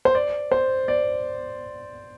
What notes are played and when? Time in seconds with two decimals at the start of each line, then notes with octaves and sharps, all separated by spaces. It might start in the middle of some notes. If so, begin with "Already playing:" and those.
0.05 C5
0.15 D5
0.52 C5
0.88 D5